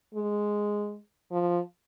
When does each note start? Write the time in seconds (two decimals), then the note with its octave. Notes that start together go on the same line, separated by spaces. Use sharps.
0.15 G#3
1.32 F3